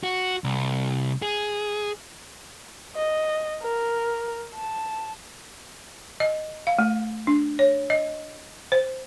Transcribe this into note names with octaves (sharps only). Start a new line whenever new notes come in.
F#4
C2
G#4
D#5
A#4
A5
D#5
F5
A3
D4
C#5
D#5
C5